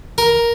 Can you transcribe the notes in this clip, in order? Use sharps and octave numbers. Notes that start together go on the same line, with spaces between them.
A#4